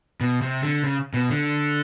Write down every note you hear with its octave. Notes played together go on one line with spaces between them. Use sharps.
B2
C3
D3
C#3
B2
D3